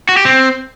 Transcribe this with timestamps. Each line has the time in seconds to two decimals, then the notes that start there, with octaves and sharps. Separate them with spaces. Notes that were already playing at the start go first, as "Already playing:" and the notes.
0.09 F#4
0.17 G4
0.25 C4